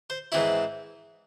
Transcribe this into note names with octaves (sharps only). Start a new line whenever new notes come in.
C5
G#2 E3 C4 E4 C#5